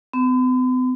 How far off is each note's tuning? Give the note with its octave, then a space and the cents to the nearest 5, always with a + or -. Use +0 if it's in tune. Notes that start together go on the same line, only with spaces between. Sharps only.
B3 +45